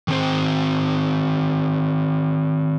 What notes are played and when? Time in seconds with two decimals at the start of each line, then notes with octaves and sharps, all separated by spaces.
0.08 D#3 C4 C5